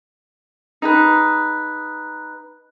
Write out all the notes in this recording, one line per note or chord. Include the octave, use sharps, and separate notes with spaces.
D#4 G#4 B4